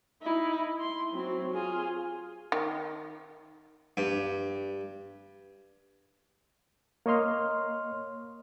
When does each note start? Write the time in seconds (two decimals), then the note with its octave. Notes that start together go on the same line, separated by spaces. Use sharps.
0.22 D#4 E4
0.80 C6
1.12 F#3 C4
1.54 F4 G#4
2.52 D#3
3.97 G2
7.06 A#3 C#5 D#5 C6 F6